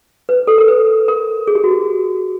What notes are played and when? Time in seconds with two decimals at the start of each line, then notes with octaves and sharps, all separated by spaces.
0.29 B4
0.47 A4
0.58 A#4
0.68 B4
1.08 A#4
1.47 G#4
1.55 G4
1.64 F#4
1.71 G4